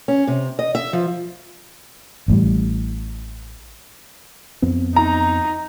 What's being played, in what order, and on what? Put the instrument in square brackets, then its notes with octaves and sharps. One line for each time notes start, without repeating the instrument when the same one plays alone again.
[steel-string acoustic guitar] C#4
C3
D#5
E5
F3
[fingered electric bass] A1 A2 G3
F2 B3 C4
[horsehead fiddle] D#4 [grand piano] A#5